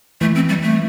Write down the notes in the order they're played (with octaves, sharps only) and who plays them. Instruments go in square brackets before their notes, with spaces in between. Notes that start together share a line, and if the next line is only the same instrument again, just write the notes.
[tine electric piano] E3 [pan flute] A3
[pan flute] C4
G3
A3